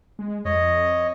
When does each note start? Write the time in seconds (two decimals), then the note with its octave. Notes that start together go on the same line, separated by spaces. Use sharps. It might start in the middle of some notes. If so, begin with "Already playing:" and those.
0.19 G#3
0.45 F2 C#5 D#5